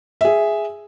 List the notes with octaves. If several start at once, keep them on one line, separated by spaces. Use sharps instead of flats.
G#4 E5